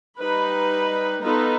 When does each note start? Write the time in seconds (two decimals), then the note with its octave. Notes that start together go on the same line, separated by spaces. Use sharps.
0.19 G3 D#4 B4
1.22 B3 D#4 F4 A4 B4